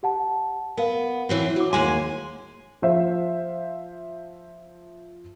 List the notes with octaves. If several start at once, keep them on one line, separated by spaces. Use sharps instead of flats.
G4 F#5 A5
B3 A#4 F5
E3 F#3 C4
F#3 F#4 D6
D#2 G#3 G#5 C6 D6
F3 C5 E5 F5